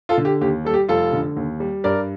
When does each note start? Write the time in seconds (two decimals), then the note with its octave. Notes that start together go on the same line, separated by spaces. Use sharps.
0.09 F4 A4
0.18 D3
0.25 G4
0.41 D#2 G4
0.65 G3 A4
0.74 G4
0.89 F1 F4 A4
1.13 D3
1.37 D#2
1.60 G3
1.84 G2 A#4 D5